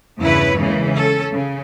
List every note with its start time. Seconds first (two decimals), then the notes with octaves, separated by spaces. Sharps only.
0.20 E2 G2 C#3 E4 B4 C#5
0.58 C#3 E3 G#3 A#3
0.92 C#4 A4
1.32 C#3